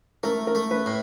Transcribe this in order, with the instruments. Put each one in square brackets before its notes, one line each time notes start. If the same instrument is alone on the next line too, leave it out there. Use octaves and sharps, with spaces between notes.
[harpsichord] A3 [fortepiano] A#4
[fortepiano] A#4
[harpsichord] A3
[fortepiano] B4
[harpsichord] A2